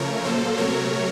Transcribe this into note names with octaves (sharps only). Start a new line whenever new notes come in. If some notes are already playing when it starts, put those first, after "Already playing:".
Already playing: C#3 F3 A3 A#4 C#5
A#2 F#3 A#3 A4 C5
C3 F#3 A3 A#4 C#5